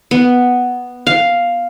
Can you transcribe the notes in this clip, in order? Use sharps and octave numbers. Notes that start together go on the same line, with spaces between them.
B3
F5